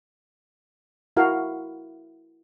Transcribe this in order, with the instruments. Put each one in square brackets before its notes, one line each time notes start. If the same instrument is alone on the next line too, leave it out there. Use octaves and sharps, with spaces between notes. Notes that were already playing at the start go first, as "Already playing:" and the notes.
[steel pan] E4 F#4 A#4 F5